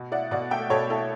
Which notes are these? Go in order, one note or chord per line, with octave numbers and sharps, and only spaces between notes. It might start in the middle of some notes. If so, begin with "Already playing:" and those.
Already playing: B2
E4 D5 F#5
B2 D5 F#5
A3 E5 G5
B2 A4 C#5
E4 A4